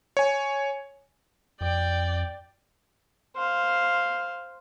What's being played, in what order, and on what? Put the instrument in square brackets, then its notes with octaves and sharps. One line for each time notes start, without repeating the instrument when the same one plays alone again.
[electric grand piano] C#5 G#5
[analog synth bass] F2 [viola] D5 G5
[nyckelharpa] C5 F5